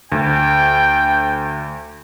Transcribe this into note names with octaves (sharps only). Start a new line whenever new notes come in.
D2 G5